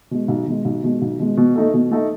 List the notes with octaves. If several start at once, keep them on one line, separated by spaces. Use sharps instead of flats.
B2 G#3
B1
B2 G#3
B1
B2 G#3
B1
B2 G#3
B2
A3 D#4 A4
B2
A3 D#4 A4